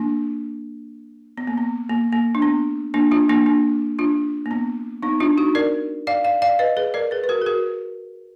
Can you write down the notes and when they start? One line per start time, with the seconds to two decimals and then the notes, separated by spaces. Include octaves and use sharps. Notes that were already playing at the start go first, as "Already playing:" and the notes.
Already playing: A#3 D4
1.37 B3
1.47 A#3
1.58 B3
1.89 A#3
2.12 A#3
2.35 D4
2.42 B3
2.94 A#3 D4
3.11 D4 F4
3.29 A#3 D4
3.46 A#3 D4
3.99 D4 F4
4.46 A#3
4.51 B3
5.03 B3 D#4
5.20 D4 F4
5.38 D#4 F#4
5.55 A#4 D5
6.07 D5 F5
6.24 D5 F5
6.42 D5 F5
6.59 B4 D#5
6.77 G#4 B4
6.94 A#4 D5
7.11 G#4 B4
7.24 B4
7.29 F#4 A#4
7.42 G#4
7.46 F#4 A#4